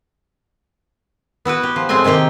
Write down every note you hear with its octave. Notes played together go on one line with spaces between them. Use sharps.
B3 E4 F#4 B4
G4
F3
A2 G#3 C4 F4 D#5 G#5
C3 D#3 A#3 G4 G5